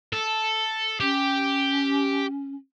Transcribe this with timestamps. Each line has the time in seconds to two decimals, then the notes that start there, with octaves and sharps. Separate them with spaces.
0.13 A4
1.00 C#4 G4